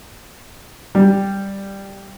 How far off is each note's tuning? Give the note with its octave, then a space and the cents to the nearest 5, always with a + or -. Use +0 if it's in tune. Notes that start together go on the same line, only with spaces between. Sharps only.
G3 +5